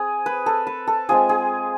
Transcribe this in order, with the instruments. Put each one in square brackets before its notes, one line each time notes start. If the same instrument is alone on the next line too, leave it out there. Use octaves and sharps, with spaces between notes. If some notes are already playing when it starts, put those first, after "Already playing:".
Already playing: [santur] C4 G#4
B4
A4
B4
A4
G#3 C4 F4 G#4
G#4